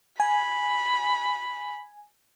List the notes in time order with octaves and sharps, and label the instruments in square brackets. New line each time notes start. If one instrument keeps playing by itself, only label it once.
[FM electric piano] G#5 [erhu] B5